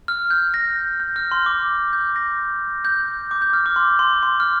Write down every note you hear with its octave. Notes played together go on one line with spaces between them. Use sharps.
F6
G6
A#6
G6
F6
C6
D6
G6
A#6
G6
D6
G6
F6
D6
C6
C6
C6
F6